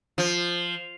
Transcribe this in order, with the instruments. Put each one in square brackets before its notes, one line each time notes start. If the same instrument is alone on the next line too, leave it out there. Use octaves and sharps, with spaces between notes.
[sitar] F3